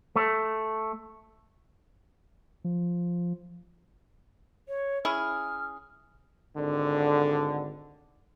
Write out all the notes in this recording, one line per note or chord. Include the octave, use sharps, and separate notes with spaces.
A3
F3
C#5
C#4 E4 G#4 F6
G#1 D3